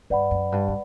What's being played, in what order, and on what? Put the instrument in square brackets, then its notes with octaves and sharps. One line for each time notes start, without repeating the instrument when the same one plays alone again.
[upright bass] G2 [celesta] B4 D5 F#5 B5
[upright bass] F#2
G2
G3